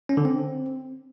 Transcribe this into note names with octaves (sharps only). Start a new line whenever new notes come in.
C#4
D3
C4